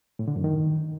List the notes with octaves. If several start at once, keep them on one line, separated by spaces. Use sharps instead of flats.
A2
D3
F#2
D#3